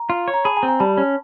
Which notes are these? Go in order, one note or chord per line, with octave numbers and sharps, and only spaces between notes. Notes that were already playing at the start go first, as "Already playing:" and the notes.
Already playing: A#5
F4
C#5
A#5
G#4 A5 B5
G#5 A#5
C4
G#5 A#5
G3 A5 B5
C#4